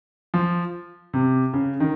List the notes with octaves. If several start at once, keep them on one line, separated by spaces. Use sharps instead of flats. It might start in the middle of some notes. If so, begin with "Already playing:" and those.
F3
C3
C#3
D#3